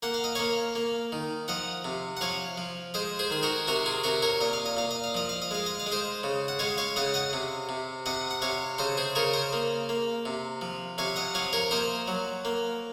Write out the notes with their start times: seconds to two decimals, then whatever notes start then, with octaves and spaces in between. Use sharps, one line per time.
0.03 A#3 F#5
0.14 F5
0.24 D#5
0.35 A#3 C#5 F5
0.76 A#3
1.12 D#3
1.48 F3 D#5 F#5
1.85 C3
2.17 F#5
2.21 F3 C#5 F5
2.58 F3
2.94 G#3 C5 D#5
3.19 G#4 C5
3.31 D#3 G#4
3.43 F#4 A#4
3.68 C3 F#4 A#4
3.86 F4 G#4
4.04 C3 F#4 A#4
4.22 A#4 C#5
4.41 A#2 D#5
4.53 F5
4.66 D#5
4.77 A#2 F5
4.91 D#5
5.04 F5
5.14 F3 D#5
5.29 F5
5.42 D#5
5.51 G#3 F5
5.66 D#5
5.80 F5
5.86 G#3
5.92 C5 D#5
6.23 C#3
6.48 F#5
6.59 G#3 C#5 F5
6.78 C#5 F5
6.96 C#3 D#5 F#5
7.14 D#5 F#5
7.33 C3
7.69 C3
8.06 C3 D#5 F#5
8.31 F#5
8.42 C3 C#5 F5
8.78 C#3 C5 D#5
8.97 G#4 C5
9.15 C#3 A#4 C#5
9.33 C5 D#5
9.53 A#3
9.89 A#3
10.26 C3
10.61 F3
10.98 C3 C#5 F5
11.16 D#5 F#5
11.35 F3 C#5 F5
11.53 A#4 C#5
11.71 A#3 C5 D#5
12.08 F#3
12.45 A#3